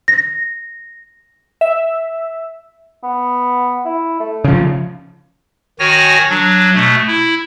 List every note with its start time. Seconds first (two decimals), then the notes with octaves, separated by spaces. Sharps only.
0.08 A#6
1.61 E5
3.03 B3
3.85 E4
4.20 A3
4.44 C#3 F3
5.79 D#3 F#4 C#5 G#5 A#6
6.30 F#3 D4
6.74 B2 A3
7.07 E4